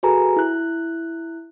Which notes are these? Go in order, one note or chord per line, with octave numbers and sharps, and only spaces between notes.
F#4 G#4 A4 B4 G#5 A#5
E4 F#6